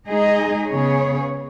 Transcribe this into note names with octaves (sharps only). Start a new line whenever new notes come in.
G#3 D#4 G#4 D#5
C#3 B3 G#4 C#5